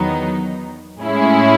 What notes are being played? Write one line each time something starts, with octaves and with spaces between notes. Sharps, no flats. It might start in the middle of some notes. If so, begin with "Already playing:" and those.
Already playing: E2 D#3 F#3 B3 D#4
A2 G#3 C#4 E4 G#4